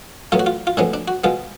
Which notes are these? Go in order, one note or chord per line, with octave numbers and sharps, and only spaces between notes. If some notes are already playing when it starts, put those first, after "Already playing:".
A2 F#3 B3 F4
F#4
F4
F4
A2 F3 G#3 B3 D4
D4
F#4
B2 G#3 B3 F4